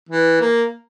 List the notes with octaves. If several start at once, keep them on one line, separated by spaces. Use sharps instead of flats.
E3
A#3